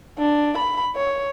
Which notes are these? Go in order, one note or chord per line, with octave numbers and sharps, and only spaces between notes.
D4
B5
C#5